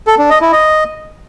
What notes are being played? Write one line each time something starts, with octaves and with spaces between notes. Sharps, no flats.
A4
D4
D#5
E4
D#5